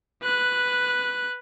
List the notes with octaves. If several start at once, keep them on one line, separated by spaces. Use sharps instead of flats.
B4 F#6